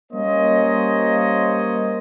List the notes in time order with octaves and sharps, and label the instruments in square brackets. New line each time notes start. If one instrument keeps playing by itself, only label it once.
[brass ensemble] G3 A#3 C#4 C5 C#5 D#5